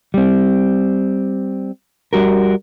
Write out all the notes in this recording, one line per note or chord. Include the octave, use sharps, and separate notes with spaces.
G3 C4
G3 F#4 A#4